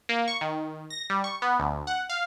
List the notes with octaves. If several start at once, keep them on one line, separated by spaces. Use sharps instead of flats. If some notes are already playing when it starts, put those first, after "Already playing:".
A#3
C#6
D#3
A#6
G3
C#6
B3
D2
F#5
F5